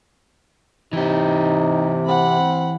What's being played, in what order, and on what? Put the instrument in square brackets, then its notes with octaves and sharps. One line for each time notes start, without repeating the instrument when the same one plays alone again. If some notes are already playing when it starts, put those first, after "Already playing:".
[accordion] C3 [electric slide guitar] E3 G4 [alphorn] D#4
[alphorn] C4 [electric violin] F#5 B5